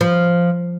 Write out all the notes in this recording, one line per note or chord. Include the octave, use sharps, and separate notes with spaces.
F3